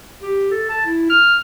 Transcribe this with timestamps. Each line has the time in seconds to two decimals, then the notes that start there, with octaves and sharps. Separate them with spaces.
0.22 G4
0.51 A4
0.70 A5
0.86 E4
1.10 F6